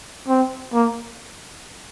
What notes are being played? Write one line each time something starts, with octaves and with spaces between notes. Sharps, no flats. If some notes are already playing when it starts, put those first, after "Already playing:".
C4
A#3